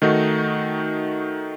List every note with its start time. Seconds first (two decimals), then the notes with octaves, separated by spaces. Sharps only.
0.02 D#3 A3 D#4 F#4